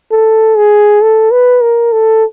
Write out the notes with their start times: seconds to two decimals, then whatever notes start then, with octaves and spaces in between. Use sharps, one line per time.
0.11 A4
0.57 G#4
1.03 A4
1.32 B4
1.62 A#4
1.93 A4